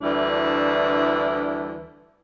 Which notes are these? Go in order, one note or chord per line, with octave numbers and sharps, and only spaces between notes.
D2 E3 G3 D4 E4